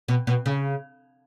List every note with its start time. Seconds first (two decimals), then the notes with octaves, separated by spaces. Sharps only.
0.08 B2
0.27 B2
0.46 C#3